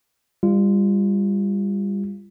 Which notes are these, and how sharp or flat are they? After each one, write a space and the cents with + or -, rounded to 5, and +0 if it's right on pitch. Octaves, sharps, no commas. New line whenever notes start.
G3 +25 F4 -20